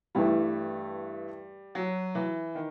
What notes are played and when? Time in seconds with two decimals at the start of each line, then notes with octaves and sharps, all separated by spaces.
0.15 G2 E3 G3 A3
1.75 F#3
2.15 E3
2.55 D#3